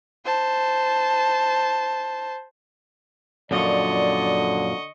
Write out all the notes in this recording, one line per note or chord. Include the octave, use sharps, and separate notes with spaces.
C5 A5
F#2 A#2 D3 F3 D5 D#5 C#6